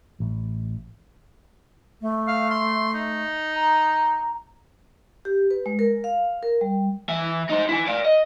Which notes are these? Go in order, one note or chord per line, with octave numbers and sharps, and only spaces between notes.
A1
A3
F5
C6
D#4
A#5
G4
B4
G#3
A#4
F5
A#4
G3
E3 E5
D#4 C5
E4 G#5
D5 F5
D#5